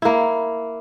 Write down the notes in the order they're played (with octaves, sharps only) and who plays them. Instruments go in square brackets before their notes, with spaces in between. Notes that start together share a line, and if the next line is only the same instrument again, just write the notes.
[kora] A#3 E4